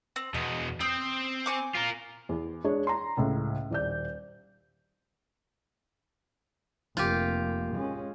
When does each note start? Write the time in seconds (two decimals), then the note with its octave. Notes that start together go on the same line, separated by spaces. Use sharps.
0.16 C4
0.34 E2 B2 D#5
0.81 C4 D#6 E6 G6
1.46 G#5 C#6 D6
1.75 F4 A#4
2.29 E2
2.64 G#3 D4 C#5
2.87 A#5 C6
3.17 C#2 A2
3.70 D#1 D5 G6
6.97 F1 A#3 F4 G4
7.75 G#3 C#4